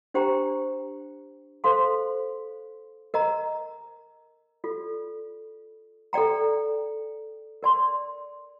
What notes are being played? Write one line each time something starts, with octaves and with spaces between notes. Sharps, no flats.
D4 G4 C5 G5 A#5
A4 C5 F5 A5 C6
A#4 D#5 A#5
F4 A4 D5
A4 D5 G5 A#5
A#4 D5 A5 C6